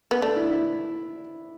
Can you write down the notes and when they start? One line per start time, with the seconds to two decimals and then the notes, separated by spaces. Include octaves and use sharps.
0.11 B3
0.22 A3 D4
0.36 E4
0.51 E4